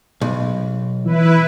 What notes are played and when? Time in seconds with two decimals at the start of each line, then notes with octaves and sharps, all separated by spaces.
0.21 B1
1.05 E3 E4 B4